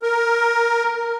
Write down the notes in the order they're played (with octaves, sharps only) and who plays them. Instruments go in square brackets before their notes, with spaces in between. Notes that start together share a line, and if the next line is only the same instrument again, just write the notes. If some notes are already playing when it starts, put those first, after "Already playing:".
[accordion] A#4